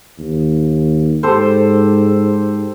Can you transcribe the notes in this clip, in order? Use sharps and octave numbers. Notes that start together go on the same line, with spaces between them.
D#2
G#2 G4 A4 C5